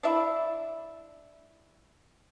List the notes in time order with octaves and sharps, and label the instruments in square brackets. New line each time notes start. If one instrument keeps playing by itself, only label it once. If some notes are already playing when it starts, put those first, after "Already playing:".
[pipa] D4 E4 E5 B5